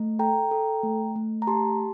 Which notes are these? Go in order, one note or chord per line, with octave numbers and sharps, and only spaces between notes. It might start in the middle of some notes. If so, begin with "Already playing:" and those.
Already playing: A3
A4 G5 A#5
A4
A3
A3
A#5
G4 A5 C6